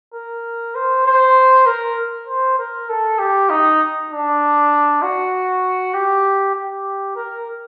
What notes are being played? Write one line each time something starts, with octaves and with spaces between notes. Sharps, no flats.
A#4
C5
C5
A#4
C5
A#4
A4
G4
D#4
D4
F#4
G4
G4
A#4